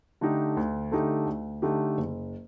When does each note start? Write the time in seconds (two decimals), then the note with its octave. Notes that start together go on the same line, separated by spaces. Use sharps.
0.21 D3 A3 D#4 G4
0.57 D2
0.92 D3 A3 D#4 G4
1.26 D2
1.62 D3 A3 D#4 G4
1.97 F#1